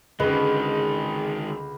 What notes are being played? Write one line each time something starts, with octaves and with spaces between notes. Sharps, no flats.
C#2 D3 D#3 G#3 G#4 B4 D#5